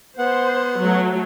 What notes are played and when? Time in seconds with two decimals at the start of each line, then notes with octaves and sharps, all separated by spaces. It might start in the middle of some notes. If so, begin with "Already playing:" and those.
0.18 B3 C5 F#5
0.79 F#3 A3